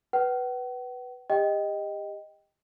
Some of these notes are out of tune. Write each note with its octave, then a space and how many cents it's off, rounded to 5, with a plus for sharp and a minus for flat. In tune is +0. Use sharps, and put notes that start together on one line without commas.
B4 +0 F#5 +45
G4 +35 D#5 +0 G5 +0